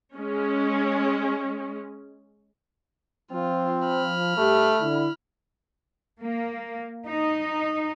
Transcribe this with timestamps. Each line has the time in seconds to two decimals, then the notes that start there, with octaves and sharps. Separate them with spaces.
0.16 G#3 C#4
3.32 F3 C4 F4
3.87 B5 F6
4.38 G2 A3 G4
4.80 D3 E4
6.21 A#3
7.06 D#4